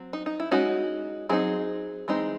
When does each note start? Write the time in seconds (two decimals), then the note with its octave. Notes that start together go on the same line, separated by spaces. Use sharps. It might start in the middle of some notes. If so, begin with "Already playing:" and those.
Already playing: F#3 C4
0.13 D#4
0.26 D#4
0.40 E4
0.51 G#3 C#4 D#4 F#4
1.29 F#3 C4 D#4 E4 G#4
2.08 E3 G#3 C4 D#4